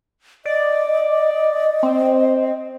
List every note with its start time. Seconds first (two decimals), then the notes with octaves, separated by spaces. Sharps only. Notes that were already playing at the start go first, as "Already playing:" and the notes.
0.45 D5 D#5
1.83 C4